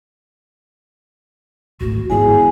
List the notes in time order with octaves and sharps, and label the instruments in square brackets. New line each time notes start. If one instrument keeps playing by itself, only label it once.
[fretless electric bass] D1 G#1 A2 [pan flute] F#4
[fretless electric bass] G1 G#2 E3 [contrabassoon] E2 [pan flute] G#4 [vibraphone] G#5